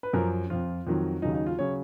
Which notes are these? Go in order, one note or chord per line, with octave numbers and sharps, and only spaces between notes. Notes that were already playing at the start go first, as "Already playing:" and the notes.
B4
F#2 F3 A#4
F2 F3 F4
F2 D#3 F#3
D#2 C#3 F#3 D#4
D#4
F4
C#3 F#3 C#5